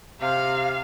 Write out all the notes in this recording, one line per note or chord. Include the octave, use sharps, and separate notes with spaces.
C3 F5